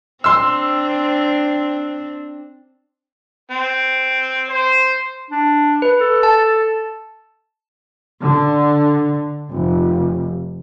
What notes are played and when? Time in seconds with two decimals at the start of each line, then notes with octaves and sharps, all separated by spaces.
0.24 C4 D4 C6 E6
3.52 C4
4.50 C5
5.31 D4
5.82 B4
6.01 A4
6.23 A5
8.22 D3
9.52 F1